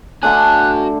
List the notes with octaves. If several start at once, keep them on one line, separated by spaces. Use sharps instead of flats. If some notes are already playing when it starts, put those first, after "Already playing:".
D3 A3 D4 F#4 G#5 F#6